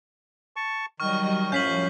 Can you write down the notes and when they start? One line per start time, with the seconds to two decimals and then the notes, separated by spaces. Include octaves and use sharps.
0.56 A5 C#6
1.00 D#3 F#3 G3 D#5 C#6 F6
1.52 F#2 A2 F3 C#4 F5 G6 B6 F#7